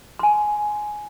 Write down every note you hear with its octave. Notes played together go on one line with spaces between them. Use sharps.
G#5 C6